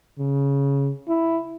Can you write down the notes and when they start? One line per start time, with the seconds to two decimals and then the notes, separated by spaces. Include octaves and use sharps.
0.19 C#3
1.08 E4